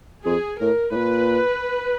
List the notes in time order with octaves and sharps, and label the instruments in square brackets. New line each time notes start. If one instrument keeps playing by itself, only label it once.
[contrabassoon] F2 [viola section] G#4
[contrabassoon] A2 [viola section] A#4
[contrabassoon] A2
[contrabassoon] A#2 [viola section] B4